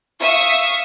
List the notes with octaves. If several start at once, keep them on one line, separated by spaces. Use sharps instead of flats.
E5 F5 C#6 D#6 E6